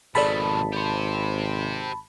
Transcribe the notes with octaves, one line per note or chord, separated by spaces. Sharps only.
G#1 B2 F3 G#4 A4 D5 A5 B5
G4 C5